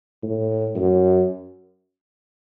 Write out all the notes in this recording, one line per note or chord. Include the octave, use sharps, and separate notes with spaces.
A2
F#2